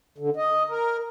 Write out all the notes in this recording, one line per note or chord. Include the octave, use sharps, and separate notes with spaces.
D3
D#5
A#4